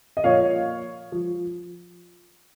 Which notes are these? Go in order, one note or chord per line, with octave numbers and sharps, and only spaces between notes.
D#5
A#2 F3 C#5 F5
F3